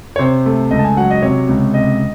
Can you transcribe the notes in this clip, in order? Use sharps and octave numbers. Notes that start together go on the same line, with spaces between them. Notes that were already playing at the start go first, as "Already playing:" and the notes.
C#5
C3 C5
A3
C#2 D#5
A5
G#5
F#3 F#5
D#5
C3 C#5
C#2
C3 D#5